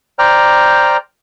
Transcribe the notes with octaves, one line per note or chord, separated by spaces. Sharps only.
C5 D5 G5 A#5 F6